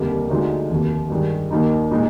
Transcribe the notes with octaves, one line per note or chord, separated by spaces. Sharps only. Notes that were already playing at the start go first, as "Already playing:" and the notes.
Already playing: F1 D#2 D3 G3 A#3
D2 D3 G#3 D#4
F1 D#2 D#3
G2 D#3 G#3
D#2 D#3 A#3 D#4
A#2 G#3 D#4